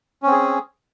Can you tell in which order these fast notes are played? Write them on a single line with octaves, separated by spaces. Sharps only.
C#4 C4 G#4